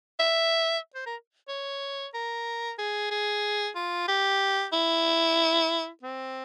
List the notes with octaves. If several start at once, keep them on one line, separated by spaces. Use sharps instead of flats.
E5
C5
A#4
C#5
A#4
G#4
G#4
F4
G4
E4
C4